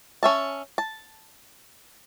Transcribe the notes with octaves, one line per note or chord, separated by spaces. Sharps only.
C#4 E5 A5
A5